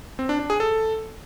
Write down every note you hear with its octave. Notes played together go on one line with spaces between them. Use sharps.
C4
D4
D4
G#4
A4